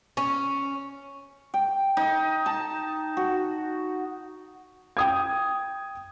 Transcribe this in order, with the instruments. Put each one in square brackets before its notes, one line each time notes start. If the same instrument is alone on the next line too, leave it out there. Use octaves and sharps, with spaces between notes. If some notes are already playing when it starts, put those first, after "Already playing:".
[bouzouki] C#4
[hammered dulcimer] G5
D#4
A5
F#4
[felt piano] G5 D#6 G#6